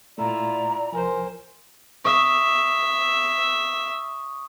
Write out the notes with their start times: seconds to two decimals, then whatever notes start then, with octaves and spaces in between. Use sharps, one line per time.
0.18 A#2 A3 E4 F4 D5 A#5
0.92 C2 F3 A#4 C5 G#5
2.05 E5 C#6 D#6